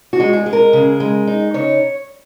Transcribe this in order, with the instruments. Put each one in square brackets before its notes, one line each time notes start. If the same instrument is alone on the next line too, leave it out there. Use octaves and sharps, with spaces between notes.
[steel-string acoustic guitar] F#4
G#3
G#4
G#3
A#4
C#3
G#3
D#4
C#3 C#5